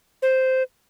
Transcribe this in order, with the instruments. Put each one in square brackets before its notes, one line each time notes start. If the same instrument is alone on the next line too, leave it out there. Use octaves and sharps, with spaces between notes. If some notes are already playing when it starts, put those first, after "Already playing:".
[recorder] C5